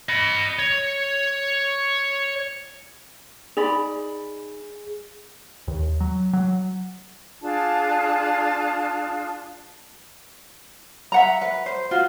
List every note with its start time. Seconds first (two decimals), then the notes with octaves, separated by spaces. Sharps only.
0.09 D#5 B5
0.59 C#5
3.57 D#4 G#4 D5 B5
5.68 D#2
6.00 F#3
6.33 F#3
7.42 D4 F4 G#4 A5
11.12 E5 F#5 A#5
11.41 B4
11.66 C5
11.91 F4 F#4